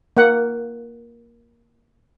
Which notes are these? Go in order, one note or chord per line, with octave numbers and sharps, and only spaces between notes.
A#3 F#5